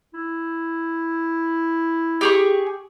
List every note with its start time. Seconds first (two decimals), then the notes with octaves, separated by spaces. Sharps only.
0.14 E4
2.21 G4 G#4 C#6